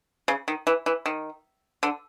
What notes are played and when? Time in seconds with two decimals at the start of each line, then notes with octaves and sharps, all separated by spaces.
0.28 C#3
0.48 D#3
0.67 E3
0.86 E3
1.06 D#3
1.83 D3